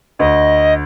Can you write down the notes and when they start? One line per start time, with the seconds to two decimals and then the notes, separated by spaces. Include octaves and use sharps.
0.19 D2 D#5